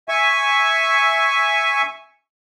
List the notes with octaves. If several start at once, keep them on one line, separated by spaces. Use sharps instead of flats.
E5 G#5 C#6